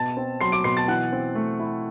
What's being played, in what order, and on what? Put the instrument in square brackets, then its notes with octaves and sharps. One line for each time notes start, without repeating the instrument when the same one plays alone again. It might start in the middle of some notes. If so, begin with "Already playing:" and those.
Already playing: [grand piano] B2 A5 A6
C4
F#3 C6 C7
D6 D7
B2 C6 C7
A5 A6
E3 F#5 F#6
C4
A3
E4